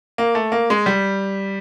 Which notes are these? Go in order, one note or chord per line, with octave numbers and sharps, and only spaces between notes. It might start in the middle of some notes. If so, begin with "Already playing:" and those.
A#3
A3
A#3
G#3
G3